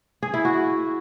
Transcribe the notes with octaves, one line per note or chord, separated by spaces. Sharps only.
G#4
E4
F#4